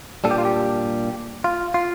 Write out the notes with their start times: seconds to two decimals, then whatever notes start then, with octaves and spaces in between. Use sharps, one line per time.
0.24 A#2 G3 D4 A4
0.31 G4
0.38 F4
0.45 G4
1.44 F4
1.74 F4